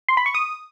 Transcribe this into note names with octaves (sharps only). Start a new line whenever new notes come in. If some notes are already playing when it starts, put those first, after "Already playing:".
C6
B5
C#6
D#6